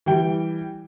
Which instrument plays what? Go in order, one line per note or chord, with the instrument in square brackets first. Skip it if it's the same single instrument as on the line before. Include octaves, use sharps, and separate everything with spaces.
[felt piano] E3 G3 G5